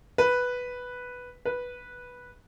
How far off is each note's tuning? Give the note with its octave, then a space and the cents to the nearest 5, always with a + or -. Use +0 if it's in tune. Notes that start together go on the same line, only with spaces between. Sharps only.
B4 +0
B4 -5